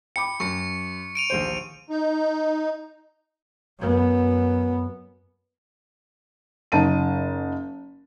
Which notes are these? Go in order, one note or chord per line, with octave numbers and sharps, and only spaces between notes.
G5 B5 D6 C#7
F#2 C#6 C#7
D7 D#7 F7
A#1 D#2 C5
D#4
F#2 B3
F#1 D#4 A5 D#7